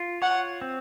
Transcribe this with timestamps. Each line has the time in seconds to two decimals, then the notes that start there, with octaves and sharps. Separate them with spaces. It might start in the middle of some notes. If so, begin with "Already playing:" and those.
Already playing: F4
0.22 C#5 F#5
0.61 C4